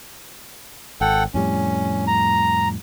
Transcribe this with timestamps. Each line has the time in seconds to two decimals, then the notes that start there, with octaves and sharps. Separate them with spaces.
1.01 G#1 A4 F#5 G5
1.34 F2 A2 G3 C#4
2.07 A#5